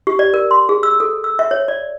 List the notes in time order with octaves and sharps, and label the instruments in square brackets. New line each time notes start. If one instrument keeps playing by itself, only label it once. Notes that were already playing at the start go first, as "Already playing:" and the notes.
[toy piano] G4
D5
A#4
C6
G#4
E6
A4
E6
E5
C#5
D5